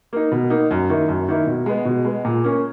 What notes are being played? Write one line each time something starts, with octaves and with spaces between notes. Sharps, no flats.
A#3 D#4
B2
A#3 D#4
F#2
D#3 A#3 E4
F#2
D#3 A#3 E4
B2
G#3 B3
B2
G#3 B3
A#2
A#3 C#4